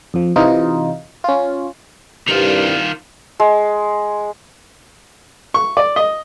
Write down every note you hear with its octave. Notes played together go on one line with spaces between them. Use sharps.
F2 F3
C3 E3 D#4 F4
C#4 F4
C2 G2 D#3 F4
G#3
C#6
D5
D#5